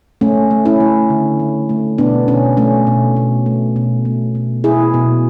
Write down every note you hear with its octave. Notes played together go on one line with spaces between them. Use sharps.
A3 C#4
A3
C#4 E4
A3
D3
A3
A3
B2 B3 D4
B2 C#4
A3 C#4
B2
B2
A3
B2
A3
B2
B2 E4 G#4
B2